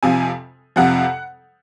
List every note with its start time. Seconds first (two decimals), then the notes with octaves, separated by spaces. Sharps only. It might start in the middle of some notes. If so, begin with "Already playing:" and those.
0.03 F2 C3 F3 G#5
0.76 F2 C3 F3 F#5